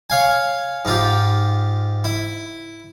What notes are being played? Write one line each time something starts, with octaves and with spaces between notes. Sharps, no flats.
C#5 F5 G#5
G#2 F4 G4
E4